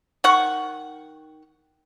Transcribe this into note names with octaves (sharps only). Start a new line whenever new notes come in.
D#3 F#5 C#6